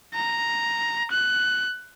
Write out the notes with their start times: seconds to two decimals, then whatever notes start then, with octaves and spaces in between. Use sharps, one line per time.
0.15 A#5
1.11 F#6